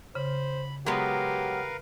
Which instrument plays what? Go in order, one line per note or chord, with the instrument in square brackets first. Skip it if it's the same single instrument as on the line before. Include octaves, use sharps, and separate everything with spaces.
[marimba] C#3 [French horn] C5 [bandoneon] B5
[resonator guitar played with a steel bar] F#3 G#3 B3 [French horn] G4 [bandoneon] A#4 B4 F5